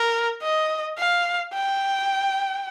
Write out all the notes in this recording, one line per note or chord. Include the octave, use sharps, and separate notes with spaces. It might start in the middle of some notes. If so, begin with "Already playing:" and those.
Already playing: A#4
D#5
F5
G5